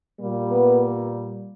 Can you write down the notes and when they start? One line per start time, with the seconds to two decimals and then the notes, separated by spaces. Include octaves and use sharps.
0.21 A#2 G3 A#3
0.51 B3